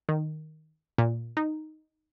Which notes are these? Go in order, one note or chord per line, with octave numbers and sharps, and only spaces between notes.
D#3
A#2
D#4